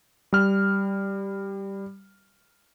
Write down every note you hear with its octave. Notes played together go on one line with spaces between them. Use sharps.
G3 F6